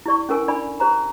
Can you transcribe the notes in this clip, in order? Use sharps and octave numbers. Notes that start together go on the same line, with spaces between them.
E4 G4 D5 C#6
C#4 A4 A#4 G#5
D4 D5 G#5 B5
G4 C5 A#5